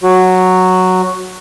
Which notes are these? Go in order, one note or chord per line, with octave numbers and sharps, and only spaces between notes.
F#3 F#4